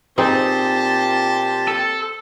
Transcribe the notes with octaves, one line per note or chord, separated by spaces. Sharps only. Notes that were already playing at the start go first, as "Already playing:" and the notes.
A#2 C4 D#4 G4 G#4 C5 A5
A4